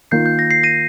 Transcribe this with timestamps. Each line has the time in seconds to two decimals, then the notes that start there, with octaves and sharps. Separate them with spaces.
0.11 D#3 A#3 F4 G6 C7
0.26 G6
0.39 A#6
0.51 C7
0.63 A#6 D#7